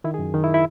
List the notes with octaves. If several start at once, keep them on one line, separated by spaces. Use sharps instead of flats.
D#3 E4
G#4
F#2
D#3 D#4
E4
E4